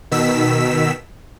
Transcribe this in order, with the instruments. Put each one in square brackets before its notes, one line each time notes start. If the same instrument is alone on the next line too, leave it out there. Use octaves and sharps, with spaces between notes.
[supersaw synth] B2 D#3 E6 B6